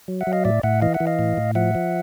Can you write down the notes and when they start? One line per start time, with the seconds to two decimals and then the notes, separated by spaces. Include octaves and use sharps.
0.08 F#3
0.21 E5 F#5
0.27 F#3
0.33 D#5 F5
0.45 A2 D5 E5
0.63 A2 E5 F#5
0.82 E3 D#5 F5
0.94 E5 F#5
1.00 E3
1.07 D#5 F5
1.19 A2
1.37 A2
1.55 F3 E5 F#5
1.75 F3